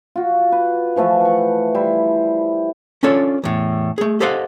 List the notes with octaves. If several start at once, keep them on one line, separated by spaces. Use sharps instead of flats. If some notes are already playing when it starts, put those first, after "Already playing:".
F4 F#4
B4
E3 F3 A3 E5
F#5 C#6
G3 E4 C5
C#4 D4 F4 A4 C#5
E2 A2
A3 G#4
G4 A4 C5 D#5 F5 F#5